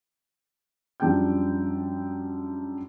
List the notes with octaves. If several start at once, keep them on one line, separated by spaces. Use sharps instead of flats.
F#2 F3 G3 D4 G5 G6